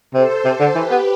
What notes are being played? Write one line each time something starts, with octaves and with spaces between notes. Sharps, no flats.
C3 A4 C5
C3 A4 C5
D3
E3 G4 B4
B3